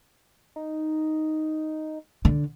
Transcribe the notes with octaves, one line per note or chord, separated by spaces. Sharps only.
D#4
D3